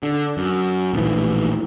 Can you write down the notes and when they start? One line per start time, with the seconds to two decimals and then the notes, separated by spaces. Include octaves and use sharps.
0.03 D3
0.37 F#2
0.94 A#1 D#2 A2 E3